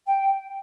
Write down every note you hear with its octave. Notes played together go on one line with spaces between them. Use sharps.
G5